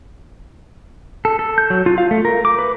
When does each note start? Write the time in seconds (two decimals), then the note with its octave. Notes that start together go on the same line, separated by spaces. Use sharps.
1.25 A4
1.39 A4
1.58 G6
1.70 F#3
1.86 F4
1.98 F5
2.11 A3
2.25 A#4
2.45 D6
2.59 B4